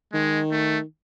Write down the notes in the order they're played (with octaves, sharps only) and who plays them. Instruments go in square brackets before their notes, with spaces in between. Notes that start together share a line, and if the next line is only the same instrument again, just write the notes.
[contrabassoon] D#3 [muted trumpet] G#3
[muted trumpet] A3